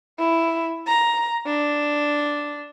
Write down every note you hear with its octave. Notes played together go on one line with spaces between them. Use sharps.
E4
A#5
D4